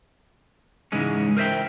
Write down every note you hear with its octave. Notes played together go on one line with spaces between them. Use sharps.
G#2 C#3 E3 G#3 C#4
A#4 C5 D#5 E5 G5